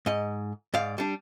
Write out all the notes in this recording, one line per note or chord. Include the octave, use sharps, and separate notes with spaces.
G#2 D#5
G#2 D5 F5
G3 D4